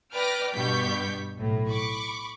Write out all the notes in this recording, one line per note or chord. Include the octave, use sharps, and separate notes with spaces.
B4 D5 G5 D6 F6 A#6
G2 B2 G4 C#6 G6 B6
B1 A2
B5 C#6 D6